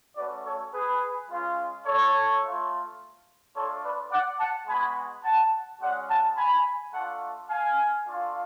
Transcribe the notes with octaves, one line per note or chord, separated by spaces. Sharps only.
A3 C#4 F#4 B4 D5
A4 C#5
G#4 B4
G#3 C#4 F4
A4 C#5
A3 F4
A3 D4 F4 A4 C#5
B4 D5
D5 F#5
F#5 A5
G#3 B3 F#4 G#5 B5
F#5 A5
G#3 C#4 F#4 D5 F#5
F#5 A5
G#5 B5
A3 D4 F4 F#5 A5
F5 G#5
A3 D4 F4